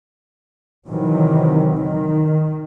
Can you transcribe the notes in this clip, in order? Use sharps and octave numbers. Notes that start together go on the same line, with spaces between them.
C3 D#3 E3 F#3
D#3